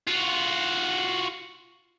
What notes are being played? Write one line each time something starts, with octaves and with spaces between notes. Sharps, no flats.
F4 F#4